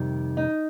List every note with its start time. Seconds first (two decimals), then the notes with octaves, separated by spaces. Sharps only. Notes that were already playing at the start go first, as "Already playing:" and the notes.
Already playing: F2 C3 D#3 G3
0.37 D#4